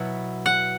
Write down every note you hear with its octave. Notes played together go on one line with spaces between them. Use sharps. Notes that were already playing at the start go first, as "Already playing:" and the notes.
Already playing: B2 F#3 B3 E4
F#5